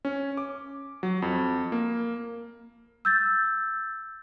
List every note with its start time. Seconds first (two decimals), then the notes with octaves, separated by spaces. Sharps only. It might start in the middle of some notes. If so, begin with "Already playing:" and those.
0.05 C#4
0.37 D6
1.03 F#3
1.22 F2
1.72 A#3
3.05 E6 G6 A6